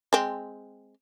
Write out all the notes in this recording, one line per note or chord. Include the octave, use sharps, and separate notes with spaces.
G#3 C4